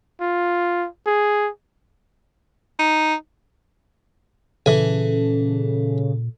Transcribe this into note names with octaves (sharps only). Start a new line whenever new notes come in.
F4
G#4
D#4
A#2 C#3 E3 A4 G#5